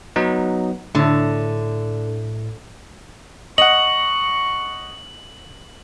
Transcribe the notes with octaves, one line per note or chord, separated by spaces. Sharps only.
F#3 B3 D#4
A2 D3 A3
D#5 F#5 C#6 F#7